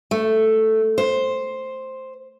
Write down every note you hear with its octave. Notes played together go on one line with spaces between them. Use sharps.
A3
C5